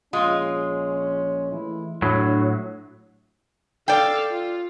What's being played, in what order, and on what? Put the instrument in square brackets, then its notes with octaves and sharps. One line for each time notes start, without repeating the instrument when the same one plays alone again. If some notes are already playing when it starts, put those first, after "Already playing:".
[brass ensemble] A#1 C#4 [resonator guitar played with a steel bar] G#3 F4
[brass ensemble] E3 A3 E4
[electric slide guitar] A2 F#3 [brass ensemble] D4
[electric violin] A4 F5 [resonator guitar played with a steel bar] D5 G5
[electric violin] F4